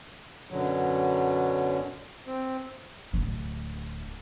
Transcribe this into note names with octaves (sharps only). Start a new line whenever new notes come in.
F#2 B2 D3 F#3
C4
D1 D3